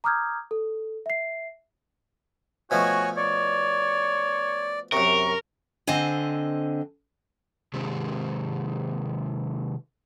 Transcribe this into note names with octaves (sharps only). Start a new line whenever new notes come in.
A#5 D6 D#6 F6 G6 G#6
A4
E5 C7
B2 F3 A3 F#4 C#5 G#5
C#5 D5
F#2 C3 A#4 C#6
D3 C4 C5 D#5 G#5
C3 D#3 G#3 C4 G4